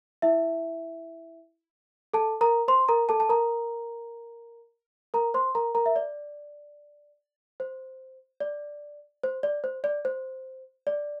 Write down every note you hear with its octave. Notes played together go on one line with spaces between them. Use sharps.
E4 E5
A4 A5
A#4 A#5
C5 C6
A#4 A#5
A4 A5
A5
A#4 A#5
A#4 A#5
C5 C6
A#4 A#5
A#4 A#5
E5
D5
C5
D5
C5
D5
C5
D5
C5
D5